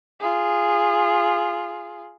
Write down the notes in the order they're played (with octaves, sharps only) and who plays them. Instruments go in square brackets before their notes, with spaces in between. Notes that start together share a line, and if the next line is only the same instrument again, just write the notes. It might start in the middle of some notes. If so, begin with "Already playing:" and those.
[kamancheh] F4 G#4